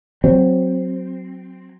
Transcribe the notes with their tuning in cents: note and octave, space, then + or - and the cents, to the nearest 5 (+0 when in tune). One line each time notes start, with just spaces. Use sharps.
F#3 +0 C4 +0